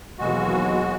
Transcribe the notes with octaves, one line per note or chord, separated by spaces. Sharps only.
D#2 B2 E3 F#3 G#3 F#4